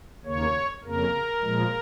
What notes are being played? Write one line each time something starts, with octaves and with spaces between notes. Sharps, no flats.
D#2 C#3 A#3 C#5
F2 C#3 A#3 A#4
A#2 F3 G#3